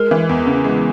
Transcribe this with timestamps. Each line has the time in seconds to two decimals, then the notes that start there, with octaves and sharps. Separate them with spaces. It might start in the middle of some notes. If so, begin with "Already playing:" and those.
Already playing: G#3 A#4
0.11 E3
0.29 E2
0.47 C#3
0.64 G#3